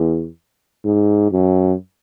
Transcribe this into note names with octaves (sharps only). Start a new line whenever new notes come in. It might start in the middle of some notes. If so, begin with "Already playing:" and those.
Already playing: E2
G#2
F#2